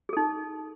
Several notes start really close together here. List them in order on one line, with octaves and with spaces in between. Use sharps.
G#4 A4 D#4